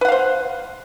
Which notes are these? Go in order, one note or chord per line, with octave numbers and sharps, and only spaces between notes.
B4 C5 F5 F#5